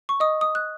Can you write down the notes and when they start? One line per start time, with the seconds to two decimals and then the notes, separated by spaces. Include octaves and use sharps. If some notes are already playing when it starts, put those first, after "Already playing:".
0.09 C#6
0.20 D#5 D#6
0.41 D#6
0.55 F#6